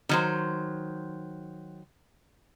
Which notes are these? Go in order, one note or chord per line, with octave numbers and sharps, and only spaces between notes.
D#3 F#3 C5